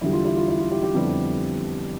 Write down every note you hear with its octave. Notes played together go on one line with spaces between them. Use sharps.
E2 D3 G3 E4
F4
E4 G4
F4
E4
F4
E4 G4
E4 G4
F2 D3 G3 B3